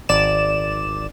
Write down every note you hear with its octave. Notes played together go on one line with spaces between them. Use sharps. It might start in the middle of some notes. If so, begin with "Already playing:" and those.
G#1 D5 E7